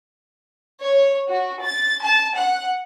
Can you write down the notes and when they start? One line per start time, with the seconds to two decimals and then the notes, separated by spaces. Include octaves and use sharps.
0.81 C#5
1.29 F#4
1.62 A6
2.01 A5
2.36 F#5